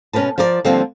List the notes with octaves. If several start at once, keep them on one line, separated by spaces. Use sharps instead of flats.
B2 C#4 G#4 A#4 B4 A5
F3 F4 A#4 D5
D3 F3 G3 A#3 C4